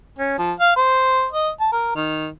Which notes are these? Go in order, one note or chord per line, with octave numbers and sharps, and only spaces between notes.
C#4
F3
F5
C5
D#5
A5
A#4
D#3